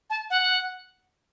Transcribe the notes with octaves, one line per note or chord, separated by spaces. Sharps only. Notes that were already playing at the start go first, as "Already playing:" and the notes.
A5
F#5